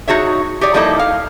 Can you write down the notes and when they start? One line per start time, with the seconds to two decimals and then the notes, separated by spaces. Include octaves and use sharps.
0.08 D#4 F#4 G#4 C#5 E5
0.61 G4 G#4 C#5 D5
0.74 F3 G3 A#3 D#4 E4 A4
0.99 F5